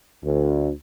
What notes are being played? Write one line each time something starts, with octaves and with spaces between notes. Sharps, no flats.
D2